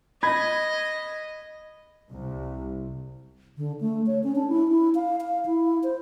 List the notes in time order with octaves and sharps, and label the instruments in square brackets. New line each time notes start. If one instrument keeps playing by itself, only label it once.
[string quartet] D#5 [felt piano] B5 G#6
[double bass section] C2
[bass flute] D3
A3
C#5
C#4
D4
E4
E4
F5
F5
E4
C5